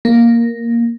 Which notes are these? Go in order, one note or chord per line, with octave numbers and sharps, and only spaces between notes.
A#3